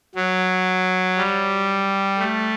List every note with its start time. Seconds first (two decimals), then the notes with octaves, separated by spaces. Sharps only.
0.15 F#3
1.17 G3
2.18 A3